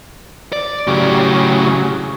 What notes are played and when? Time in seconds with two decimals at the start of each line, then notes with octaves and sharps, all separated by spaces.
0.53 D5
0.87 A2 C#3 F#3 G4